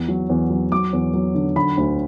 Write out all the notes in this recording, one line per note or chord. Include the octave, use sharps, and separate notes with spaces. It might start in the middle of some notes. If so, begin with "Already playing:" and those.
Already playing: E2
F#3
E2
F#3
F#3 D6
E2
F#3
D3
D3 B5
D2